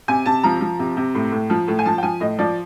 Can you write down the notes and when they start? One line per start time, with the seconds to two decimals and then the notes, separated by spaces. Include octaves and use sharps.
0.08 C3 G#5
0.26 C3 A5
0.43 F3 A#5
0.61 F3
0.79 C3
0.97 C3
1.15 A2
1.32 A2
1.50 F3
1.68 A2
1.79 G#5
1.86 F3 A5
1.98 G5
2.03 F3 G#5
2.20 A2 D#5
2.39 F3 D5